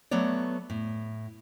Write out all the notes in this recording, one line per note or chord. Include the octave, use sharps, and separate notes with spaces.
F#3 A3 B3 C#5 D5
A2